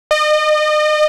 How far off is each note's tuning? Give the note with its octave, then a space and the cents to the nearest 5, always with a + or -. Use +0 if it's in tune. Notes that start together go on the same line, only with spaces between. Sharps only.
D#5 -40